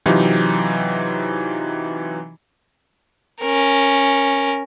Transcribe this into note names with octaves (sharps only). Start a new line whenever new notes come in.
C3 E3 F#3 D#4 F4 G4
C#4 A#4